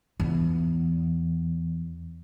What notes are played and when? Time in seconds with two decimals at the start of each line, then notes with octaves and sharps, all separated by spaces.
0.20 E2